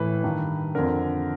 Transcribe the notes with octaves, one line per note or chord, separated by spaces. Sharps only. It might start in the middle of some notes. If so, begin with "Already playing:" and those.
Already playing: A2 E3 B4
G2 D#3
F2 D3 A#4